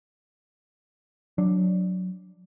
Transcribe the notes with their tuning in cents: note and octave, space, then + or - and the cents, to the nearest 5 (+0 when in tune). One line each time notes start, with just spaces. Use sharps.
F#3 -10 D4 +0